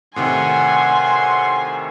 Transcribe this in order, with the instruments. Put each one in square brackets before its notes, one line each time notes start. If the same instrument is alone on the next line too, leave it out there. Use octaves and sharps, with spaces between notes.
[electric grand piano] A2 C3 D#3 [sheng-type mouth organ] F#5 [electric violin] G#5 [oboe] C6